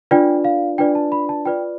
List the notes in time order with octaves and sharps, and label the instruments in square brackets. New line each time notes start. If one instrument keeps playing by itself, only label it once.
[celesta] D4 F4 B4 D5 G5
F5
D4 F4 B4 D5 G5
A5
B5
A5
F4 B4 D5 G5